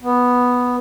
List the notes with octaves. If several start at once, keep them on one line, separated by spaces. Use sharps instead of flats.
B3